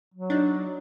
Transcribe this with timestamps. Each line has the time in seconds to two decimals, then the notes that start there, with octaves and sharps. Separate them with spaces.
0.14 F#3
0.30 D4 D#4